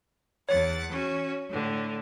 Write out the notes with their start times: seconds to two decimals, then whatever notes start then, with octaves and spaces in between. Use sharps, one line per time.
0.49 E2 C#5 F#5 A6
0.91 C#4 F#4
1.48 A2 D3